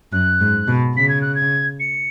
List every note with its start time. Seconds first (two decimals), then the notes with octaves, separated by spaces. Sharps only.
0.12 F#2 F#6
0.40 G#2
0.68 B2
0.96 C#3 B6
1.09 G#6
1.22 F#6
1.35 G#6
1.80 C#7